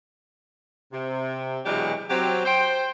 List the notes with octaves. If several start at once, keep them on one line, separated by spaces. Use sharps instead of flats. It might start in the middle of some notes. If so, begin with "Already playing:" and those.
C3
B2 E3 F#3 G#3 D4 G4
F#3 C4 G4
C5 G5